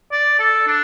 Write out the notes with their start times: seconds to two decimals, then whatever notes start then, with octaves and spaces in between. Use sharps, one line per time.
0.12 D5
0.39 A4
0.67 D4